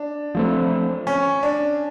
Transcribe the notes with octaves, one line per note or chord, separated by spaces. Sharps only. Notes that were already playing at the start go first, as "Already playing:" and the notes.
Already playing: D4
F3 A3 C4
C#4
D4